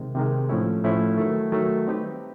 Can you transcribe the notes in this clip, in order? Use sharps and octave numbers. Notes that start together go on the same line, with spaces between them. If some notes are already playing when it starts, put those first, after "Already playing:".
Already playing: C3 D#3 G#3
C3 D#3 G#3
A2 F3 A3 C#4 E4
A2 F3 A3 C#4 E4
D#3 F#3 A3
D#3 F#3 A3
G3 C4 D#4 G4 B4